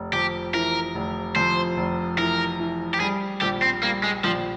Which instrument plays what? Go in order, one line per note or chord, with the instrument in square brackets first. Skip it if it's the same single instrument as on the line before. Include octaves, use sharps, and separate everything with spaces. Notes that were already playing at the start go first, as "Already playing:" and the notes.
Already playing: [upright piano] F1
[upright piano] F2 [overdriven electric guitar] G4
[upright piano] E3 [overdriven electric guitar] A#4
[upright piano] F1
[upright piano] F2 [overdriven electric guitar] C5
[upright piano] F1
[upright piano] E3 [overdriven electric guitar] A#4
[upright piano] E3
[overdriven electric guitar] G4
[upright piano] G3 [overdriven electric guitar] G#4
[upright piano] A#1 [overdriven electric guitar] G4
[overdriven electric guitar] C4
[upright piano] G3 [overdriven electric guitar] A#3
[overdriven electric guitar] G#3
[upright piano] A#1 [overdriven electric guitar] F3